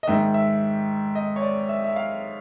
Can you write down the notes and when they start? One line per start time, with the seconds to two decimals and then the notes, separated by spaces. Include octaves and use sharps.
0.03 D#5
0.07 G#2 D#3 E5
0.34 E5
1.15 D#5
1.36 C#5
1.42 D5
1.69 E5
1.84 E5
1.96 F5